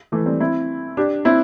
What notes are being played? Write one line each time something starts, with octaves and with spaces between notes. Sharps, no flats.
E3 A3
G3 C4
C4 E4
D4 G4
C4 E4